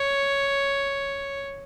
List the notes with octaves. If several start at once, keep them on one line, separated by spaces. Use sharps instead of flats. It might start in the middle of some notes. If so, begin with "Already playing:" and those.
Already playing: C#5